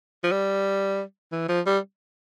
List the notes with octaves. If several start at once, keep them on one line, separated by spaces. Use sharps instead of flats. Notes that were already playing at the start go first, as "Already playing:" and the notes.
F3
G3
E3
F3
G3